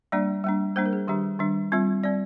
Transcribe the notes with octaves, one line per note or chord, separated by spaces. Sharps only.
G3 A#3 D4 D5
G3 A#3 D4
G3 A#3 D4 C5
A#4
G#4
D#3 G3 D4 G4
D#3 G3 D4
G3 C4 F4
G3 C4 D5